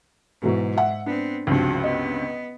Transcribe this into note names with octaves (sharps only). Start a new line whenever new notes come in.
G#2 B2 E3 F#3
E5 F#5
B3 C4 D4
C#2 G2 C3 F3 F#4
B3 D#5